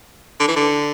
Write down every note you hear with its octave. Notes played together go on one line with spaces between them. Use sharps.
D3
E3
D3